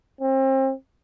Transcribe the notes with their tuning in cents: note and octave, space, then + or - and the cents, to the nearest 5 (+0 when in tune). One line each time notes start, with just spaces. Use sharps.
C4 +35